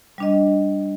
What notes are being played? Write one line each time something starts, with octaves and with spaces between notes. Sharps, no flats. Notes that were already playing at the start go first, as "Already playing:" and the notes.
G3 D4 D#5